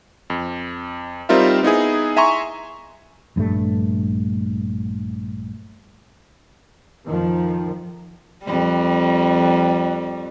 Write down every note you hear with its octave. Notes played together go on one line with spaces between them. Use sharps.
F2
G3 C4 D#4 F4 A#4 E5
B3 D#4 E4 G#4
E5 G#5 A#5 C6 C#6
A#1 G2 G3 A3
F2 D#3 F3
F2 G3